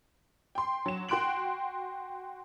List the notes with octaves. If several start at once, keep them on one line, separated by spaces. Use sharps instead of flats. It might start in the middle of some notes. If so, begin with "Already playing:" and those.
G5 C6
F#3 E7
F#4 G5 C6 F#6 D7 F#7